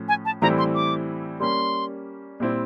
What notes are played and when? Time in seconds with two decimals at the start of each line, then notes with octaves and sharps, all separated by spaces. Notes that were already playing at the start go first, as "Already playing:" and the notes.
Already playing: A2 F3 C#4
0.08 G#5
0.25 A5
0.42 A2 E3 G3 C4 E4 A#5
0.58 C6
0.75 D6
1.40 G3 A#3 C#4 C6
2.40 A#2 G3 C4 E4